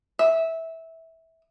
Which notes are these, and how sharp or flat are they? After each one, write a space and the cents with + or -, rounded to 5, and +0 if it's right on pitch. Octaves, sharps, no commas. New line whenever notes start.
E5 -15